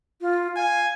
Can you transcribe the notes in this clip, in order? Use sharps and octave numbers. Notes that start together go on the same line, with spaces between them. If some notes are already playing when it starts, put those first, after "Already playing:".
F4
F5 G#5